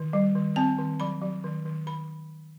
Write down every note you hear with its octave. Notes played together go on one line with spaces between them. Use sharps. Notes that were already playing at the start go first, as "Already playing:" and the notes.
Already playing: D#3
G3
D#3
C4 A5
D#3
F#3 B5
F#3
D#3
D#3
D#3 B5